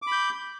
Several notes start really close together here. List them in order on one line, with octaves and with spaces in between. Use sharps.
D6 B5 G6